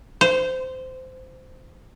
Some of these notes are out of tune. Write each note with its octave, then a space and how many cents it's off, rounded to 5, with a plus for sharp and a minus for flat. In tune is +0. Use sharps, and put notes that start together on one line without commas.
C5 -20